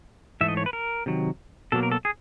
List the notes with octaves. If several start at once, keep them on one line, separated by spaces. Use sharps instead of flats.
G#2 E3 A3 E5
D#5
C#5
B4
A#4
C3 D#3 F#3
B2 F#3 A#3 A4
A#4
A4
G#4